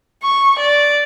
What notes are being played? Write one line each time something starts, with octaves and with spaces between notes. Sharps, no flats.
C#6
D5